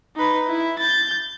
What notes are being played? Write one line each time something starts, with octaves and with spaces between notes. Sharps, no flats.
D#4 B4
E4
G6 A6